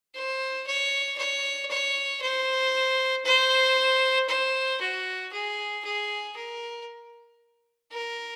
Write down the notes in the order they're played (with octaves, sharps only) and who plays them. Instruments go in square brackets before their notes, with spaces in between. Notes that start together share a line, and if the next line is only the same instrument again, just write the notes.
[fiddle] C5
C#5
C#5
C#5
C5
C5
C5
F#4
G#4
G#4
A#4
A#4